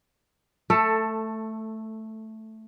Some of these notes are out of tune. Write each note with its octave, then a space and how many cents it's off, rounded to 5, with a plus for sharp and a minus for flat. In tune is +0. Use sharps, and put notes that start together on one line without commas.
A3 +0 A4 +15